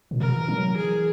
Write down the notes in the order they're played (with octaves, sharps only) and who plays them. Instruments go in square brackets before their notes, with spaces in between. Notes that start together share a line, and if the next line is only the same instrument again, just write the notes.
[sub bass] A#2
[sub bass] B2 [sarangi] A#4
[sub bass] E3
F#3
[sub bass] E3 [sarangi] G#4